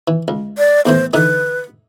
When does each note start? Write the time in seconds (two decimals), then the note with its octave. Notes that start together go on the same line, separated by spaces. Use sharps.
0.08 E3
0.28 C#2
0.58 D5
0.85 E2 A2 E3 C5
1.13 D3 E3 D#4 B4